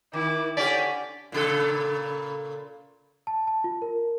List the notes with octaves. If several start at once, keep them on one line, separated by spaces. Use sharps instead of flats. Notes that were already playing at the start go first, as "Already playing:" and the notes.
D#3 E4 D6
D3 C#4 G4 D5 B6
A#2 C#3 A4
A5
A5
F4
A#4